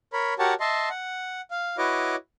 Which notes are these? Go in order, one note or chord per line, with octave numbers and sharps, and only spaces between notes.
A#4 C#5 B5
F#4 G4 A#4 C#5 F#5 A5
D#5 E5 A5 C6
F#5
F5
E4 F#4 B4 C#5 D#5 D6